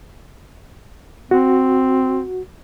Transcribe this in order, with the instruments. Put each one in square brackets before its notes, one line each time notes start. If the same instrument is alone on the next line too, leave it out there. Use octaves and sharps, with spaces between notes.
[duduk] C4 [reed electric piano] F#4